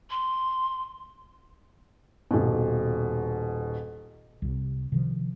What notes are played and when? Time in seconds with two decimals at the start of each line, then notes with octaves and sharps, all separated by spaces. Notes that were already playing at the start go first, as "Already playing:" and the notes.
0.10 C6
2.31 D#1 B2
4.42 C2 C3
4.92 C3 D#3 F3